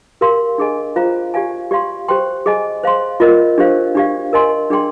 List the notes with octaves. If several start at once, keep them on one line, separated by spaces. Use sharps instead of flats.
G4 A#4 F5 C6
D4 G#4 D#5 G#5
F4 C5 F5 A#5
G4 D5 F5 G#5
G4 D5 F5 C6
G4 C5 G5 C6
G#4 D#5 G#5
C5 F5 C6
F4 A#4 D#5
D4 G4 C5 F5
D4 G4 D5 F5
A#4 D#5 G#5 C6
D4 G#4 D5 G5 C6